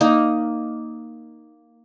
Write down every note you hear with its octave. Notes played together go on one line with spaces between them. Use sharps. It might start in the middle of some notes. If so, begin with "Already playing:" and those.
A#3 D#4